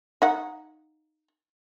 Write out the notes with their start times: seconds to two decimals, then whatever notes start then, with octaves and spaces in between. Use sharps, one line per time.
0.22 D#4 F#5